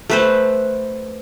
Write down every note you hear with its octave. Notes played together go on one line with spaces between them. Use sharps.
A3 B4 C5